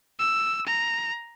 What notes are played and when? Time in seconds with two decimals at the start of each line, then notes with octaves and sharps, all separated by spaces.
0.19 E6
0.67 A#5